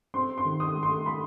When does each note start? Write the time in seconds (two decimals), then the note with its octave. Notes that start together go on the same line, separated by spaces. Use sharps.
0.14 C4 C6
0.38 C6
0.45 D#3
0.60 D#6
0.76 A3
0.83 C6
1.06 A3 B5